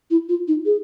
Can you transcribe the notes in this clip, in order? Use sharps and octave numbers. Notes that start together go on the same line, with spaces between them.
E4
F4
D#4
G#4